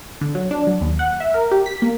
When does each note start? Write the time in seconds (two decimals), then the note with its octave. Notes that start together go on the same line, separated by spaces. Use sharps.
0.21 D3
0.35 F#3
0.51 D4
0.67 F#3
0.81 D#2
0.99 F#5
1.20 E5
1.34 A#4
1.51 G4
1.66 B6
1.82 A#3